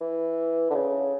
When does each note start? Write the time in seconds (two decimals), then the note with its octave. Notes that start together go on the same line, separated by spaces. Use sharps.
0.01 E3
0.70 D3
0.75 C#3